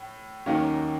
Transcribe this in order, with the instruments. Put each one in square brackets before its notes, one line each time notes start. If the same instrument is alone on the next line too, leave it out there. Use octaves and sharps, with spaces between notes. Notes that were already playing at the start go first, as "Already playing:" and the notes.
Already playing: [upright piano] A2
D#2 D#3 F#3 A#3 C#4